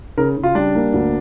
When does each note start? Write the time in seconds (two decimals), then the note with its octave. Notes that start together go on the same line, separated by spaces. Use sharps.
0.17 C#3 A#4
0.37 C#3
0.43 F4
0.55 G3 D4
0.75 A#3
0.94 D2